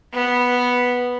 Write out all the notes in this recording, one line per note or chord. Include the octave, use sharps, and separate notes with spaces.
B3